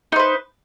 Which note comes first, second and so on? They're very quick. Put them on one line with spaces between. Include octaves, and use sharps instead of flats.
D#4 C5 B4